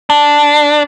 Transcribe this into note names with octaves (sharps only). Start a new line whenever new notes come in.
D4